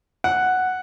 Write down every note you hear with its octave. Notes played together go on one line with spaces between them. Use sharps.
F#5